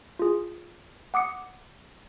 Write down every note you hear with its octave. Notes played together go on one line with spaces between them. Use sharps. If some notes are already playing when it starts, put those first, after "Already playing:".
F4 G#4
F#5 D6 D#6 C#7